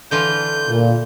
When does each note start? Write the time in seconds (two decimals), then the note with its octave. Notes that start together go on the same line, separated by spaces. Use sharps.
0.11 D3 E3 F4 G6
0.68 A#2